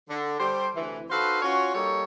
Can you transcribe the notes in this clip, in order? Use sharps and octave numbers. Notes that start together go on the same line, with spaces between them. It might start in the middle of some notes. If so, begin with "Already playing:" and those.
D3
G3 G4 A4 C5
D2 C3 E3
D#4 F#4 A4 B4 C5 F5
C#4 F4 F#4 C#5
G3 A#3 D#4 A4 C#5